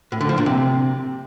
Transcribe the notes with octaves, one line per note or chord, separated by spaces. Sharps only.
A2
D3
F3
A#2
C3